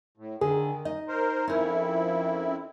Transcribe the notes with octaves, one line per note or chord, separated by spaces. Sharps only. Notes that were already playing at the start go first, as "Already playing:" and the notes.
A2
D3 D#3 G#4
D#4 D#5
A#4 C5
F2 C#4 E4 A#4